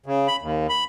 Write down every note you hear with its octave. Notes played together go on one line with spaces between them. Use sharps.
C#3
B5
D#2
B5